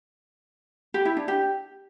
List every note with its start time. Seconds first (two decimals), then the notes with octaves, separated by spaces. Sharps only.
0.94 G4
1.05 E4
1.17 D4
1.28 G4